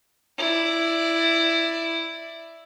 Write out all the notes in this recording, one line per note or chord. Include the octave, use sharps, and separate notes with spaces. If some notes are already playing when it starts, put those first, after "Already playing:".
E4 D5